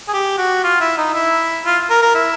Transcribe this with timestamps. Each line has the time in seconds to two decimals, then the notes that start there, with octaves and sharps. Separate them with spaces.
0.08 G#4
0.13 G4
0.38 F#4
0.64 F4
0.80 E4
0.97 D#4
1.14 E4
1.65 F4
1.90 A#4
2.02 A#4
2.15 E4